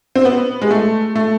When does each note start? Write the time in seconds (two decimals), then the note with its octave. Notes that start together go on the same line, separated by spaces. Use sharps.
0.15 C4
0.25 B3
0.62 G#3
0.71 A3
1.15 A3